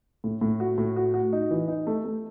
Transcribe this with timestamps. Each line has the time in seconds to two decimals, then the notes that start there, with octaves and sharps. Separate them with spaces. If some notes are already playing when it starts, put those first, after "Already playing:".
0.24 A2
0.41 A2
0.60 F#4
0.78 A2
0.96 F#4
1.14 F#4
1.33 D#4
1.51 E3
1.68 D#4
1.87 A3
2.05 A3